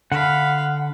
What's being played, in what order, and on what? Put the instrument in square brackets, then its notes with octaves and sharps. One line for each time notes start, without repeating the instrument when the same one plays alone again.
[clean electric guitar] D3 [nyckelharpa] F5 B5 [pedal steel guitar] F#5